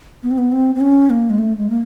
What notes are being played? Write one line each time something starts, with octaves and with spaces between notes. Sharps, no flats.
B3
C4
B3
C4
C4
C#4
A#3
G#3
A3
G#3
A#3